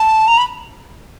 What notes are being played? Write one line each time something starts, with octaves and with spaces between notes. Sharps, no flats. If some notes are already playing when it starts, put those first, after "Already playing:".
Already playing: A5
A#5
B5